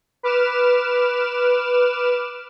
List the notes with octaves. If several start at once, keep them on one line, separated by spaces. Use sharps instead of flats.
B4 D6 F6 E7